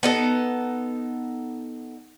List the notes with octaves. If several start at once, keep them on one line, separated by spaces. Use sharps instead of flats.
B3 D#4 A4